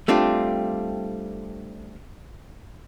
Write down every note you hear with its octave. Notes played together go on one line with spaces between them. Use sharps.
G3 A3 C4 D4 F4